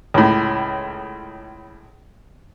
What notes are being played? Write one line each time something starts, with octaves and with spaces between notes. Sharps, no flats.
C#2 A2